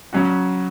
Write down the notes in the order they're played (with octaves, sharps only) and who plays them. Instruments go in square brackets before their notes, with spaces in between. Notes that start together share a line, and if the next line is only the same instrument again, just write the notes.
[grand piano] C#3 F#3 C#4 F#4